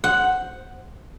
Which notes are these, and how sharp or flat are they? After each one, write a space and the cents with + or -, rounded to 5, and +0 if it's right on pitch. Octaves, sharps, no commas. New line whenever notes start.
C5 +0 F#5 +0